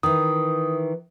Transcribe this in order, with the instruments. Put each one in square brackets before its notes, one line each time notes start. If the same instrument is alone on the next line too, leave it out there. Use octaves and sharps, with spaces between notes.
[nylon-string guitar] D#3 E3 [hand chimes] D#6